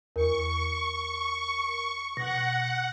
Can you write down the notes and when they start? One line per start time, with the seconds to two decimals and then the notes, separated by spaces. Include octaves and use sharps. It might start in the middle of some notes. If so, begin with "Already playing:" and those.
0.16 E2 A#4 C#6
2.17 B2 F#5 A#6